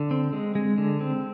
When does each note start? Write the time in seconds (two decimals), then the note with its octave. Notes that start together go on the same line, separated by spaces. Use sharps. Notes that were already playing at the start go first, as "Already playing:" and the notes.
Already playing: D3
0.11 C4
0.33 G#3
0.55 G#3
0.78 D3
1.01 C4